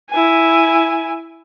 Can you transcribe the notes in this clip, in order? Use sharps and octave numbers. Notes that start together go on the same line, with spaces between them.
E4 G#5